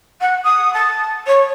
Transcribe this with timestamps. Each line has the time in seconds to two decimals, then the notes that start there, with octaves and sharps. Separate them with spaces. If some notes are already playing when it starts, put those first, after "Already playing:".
0.21 F#5
0.44 D#6
0.73 A5
1.27 C#5